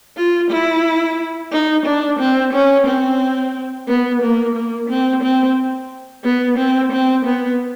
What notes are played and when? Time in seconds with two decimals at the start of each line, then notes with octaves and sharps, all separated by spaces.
0.17 F4
0.51 E4
1.52 D#4
1.85 D4
2.19 C4
2.53 C#4
2.86 C4
3.88 B3
4.22 A#3
4.55 A#3
4.89 C4
5.22 C4
6.24 B3
6.58 C4
6.92 C4
7.25 B3